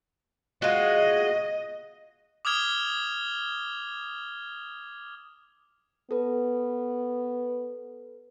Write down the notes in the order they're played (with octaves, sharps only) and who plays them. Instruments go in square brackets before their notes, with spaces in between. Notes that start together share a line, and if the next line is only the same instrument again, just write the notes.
[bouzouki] G#3 F4 F#4 [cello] D#5
[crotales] D6 D#6 F6 G#6 F7 G7
[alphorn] B3 [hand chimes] A4 B4